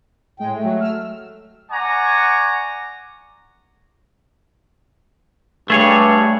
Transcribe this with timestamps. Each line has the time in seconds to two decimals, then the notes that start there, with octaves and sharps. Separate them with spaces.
0.40 A2 G#3 G5
0.52 A3
0.64 F#3
0.80 E6 F6
1.71 D5 F#5 G#5 A#5 C#6
5.70 G2 A3 G#4 C#5